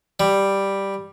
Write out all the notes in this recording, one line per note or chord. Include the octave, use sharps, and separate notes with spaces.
G3